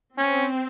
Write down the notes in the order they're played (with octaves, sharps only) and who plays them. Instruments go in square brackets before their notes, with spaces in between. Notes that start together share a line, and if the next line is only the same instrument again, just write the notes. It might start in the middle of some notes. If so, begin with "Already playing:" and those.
[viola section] C4 [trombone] C#4